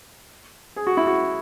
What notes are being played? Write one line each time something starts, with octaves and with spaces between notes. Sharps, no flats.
G#4
F#4
E4
F#4